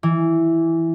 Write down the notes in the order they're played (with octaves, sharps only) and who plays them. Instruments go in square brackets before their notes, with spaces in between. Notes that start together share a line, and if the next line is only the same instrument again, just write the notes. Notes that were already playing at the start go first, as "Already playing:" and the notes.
[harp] E3